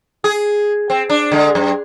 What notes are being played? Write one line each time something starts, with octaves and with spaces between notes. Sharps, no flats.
G#4
C4
D4
D3 G#3
F#2